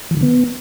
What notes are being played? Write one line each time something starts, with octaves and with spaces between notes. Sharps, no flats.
E3
D3
B3